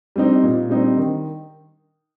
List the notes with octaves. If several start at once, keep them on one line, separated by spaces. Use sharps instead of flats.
G3 C4 D#4
A#2
G3 C4 D#4
D#3